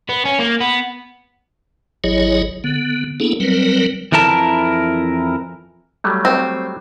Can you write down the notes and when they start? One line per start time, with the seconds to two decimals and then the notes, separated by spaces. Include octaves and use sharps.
0.09 B3
0.25 C#4
0.39 A#3
0.61 B3
2.04 G#1 F#3 E4 G#4 C#5 D#5
2.64 D3 B3
3.20 A#3 B3 D4 E4 G#4 A4
3.40 F#3 G3 C4 A#4 B4
4.12 F2 E3 E4 A#4 A5
6.04 F#3 G3 A3
6.25 C4